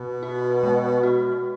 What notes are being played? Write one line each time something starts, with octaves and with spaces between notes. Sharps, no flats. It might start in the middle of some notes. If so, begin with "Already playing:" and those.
Already playing: B2
F#4
G#3
F#4